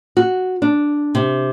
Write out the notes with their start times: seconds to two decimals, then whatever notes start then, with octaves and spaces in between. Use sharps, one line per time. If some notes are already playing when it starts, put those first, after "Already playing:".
0.17 F#4
0.62 D4
1.15 C3